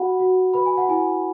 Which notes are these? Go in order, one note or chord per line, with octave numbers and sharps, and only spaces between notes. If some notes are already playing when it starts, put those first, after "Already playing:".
Already playing: F#4 F#5 B5
F#4
B4 B5
G#5
F#5
E4 G#5